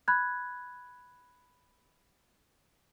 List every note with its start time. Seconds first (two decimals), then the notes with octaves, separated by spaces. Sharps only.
0.08 B5 F#6 G#6